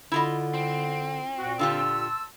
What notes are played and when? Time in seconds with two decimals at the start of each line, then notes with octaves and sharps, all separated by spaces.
0.12 D3 E4 F4 D#5
0.54 C4
1.38 A#2 F#4
1.59 D3 F4 G4 A5 C6 E6